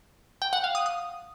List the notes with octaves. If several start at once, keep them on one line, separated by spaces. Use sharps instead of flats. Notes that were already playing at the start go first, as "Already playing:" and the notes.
G5
F#5
F5
D#6
D#6